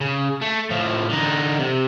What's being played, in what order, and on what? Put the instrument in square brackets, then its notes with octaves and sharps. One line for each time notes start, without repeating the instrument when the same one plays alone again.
[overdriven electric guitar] C#3
A3
A2 F3
D3 D#4
C3